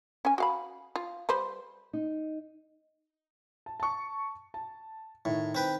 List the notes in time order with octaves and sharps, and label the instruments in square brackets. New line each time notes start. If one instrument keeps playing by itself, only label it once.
[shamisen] C#4 G#5
F#4 F5 B5
F4
G3 B4 C5
[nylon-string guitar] D#4
[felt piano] A5
A5 C#6
A5
[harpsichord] A2 [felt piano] D#3
[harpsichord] C4 B4 G5